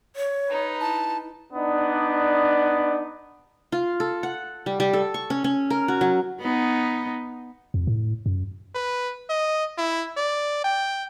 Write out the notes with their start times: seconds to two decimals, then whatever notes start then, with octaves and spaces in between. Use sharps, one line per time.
0.16 C#5
0.49 D#4 B4
0.81 E4 A5
1.53 B3 D4 D#4 D5
3.72 F4
4.00 A4
4.23 F#5
4.66 G3
4.80 G3
4.93 A4
5.14 C#6
5.30 C#4
5.44 C#4
5.70 A#4
5.88 F#4
6.01 F#3
6.40 B3 D#4
7.74 F2
7.87 A2
8.26 F#2
8.75 B4
9.29 D#5
9.78 E4
10.17 D5
10.64 G5